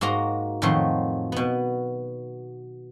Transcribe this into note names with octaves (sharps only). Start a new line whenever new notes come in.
G#2 A#3 F#4 A#5 C6
F2 A2 D#3 F3 F#3 C6
B2 B3